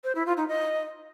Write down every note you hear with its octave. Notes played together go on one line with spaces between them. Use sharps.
C5
E4
F4
D#4
D#5